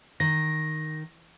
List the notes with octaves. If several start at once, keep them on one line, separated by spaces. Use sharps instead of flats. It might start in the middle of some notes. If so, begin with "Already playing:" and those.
D#3 A#6